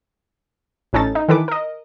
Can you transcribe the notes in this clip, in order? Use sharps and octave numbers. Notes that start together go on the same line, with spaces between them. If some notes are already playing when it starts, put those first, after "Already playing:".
A1 A2 C#4 D#4 A4 A6
D#4
D#3 E3 A4 B4 D6
A#4 D#5